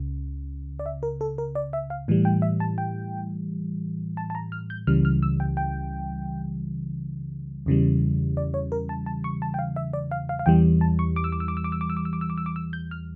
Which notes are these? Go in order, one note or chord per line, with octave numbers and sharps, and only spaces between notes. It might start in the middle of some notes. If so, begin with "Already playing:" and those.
Already playing: C#2 C#3
D5
E5
A#4
A4
A#4
D5
E5
F5
A2 E3 G3
G5
E5
A5
G5
A5
A5
A#5
F6
G6
C#2 C#3 E3 G3 F6
F6
E6
G5
G5
E2 C#3 E3 G3
D5
C#5
A#4
A5
A5
C#6
A5
G5
F5
E5
D5
F5
F5
F5
E2 E3 G3 G5
A5
C#6
D6
E6
D6
E6
D6
E6
D6
E6
D6
E6
D6
E6
D6
E6
D6
E6
D6
E6
G6
F6